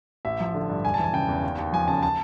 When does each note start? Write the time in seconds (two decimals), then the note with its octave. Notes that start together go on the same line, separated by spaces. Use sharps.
0.25 A1 E5
0.40 F3
0.54 D3
0.69 G2
0.85 E1 G#5
0.94 A5
0.99 E3 G#5
1.13 C#3 G5
1.28 E2
1.43 D#2
1.58 D#2
1.72 F3 G#5
1.88 C#3 A5
2.03 A5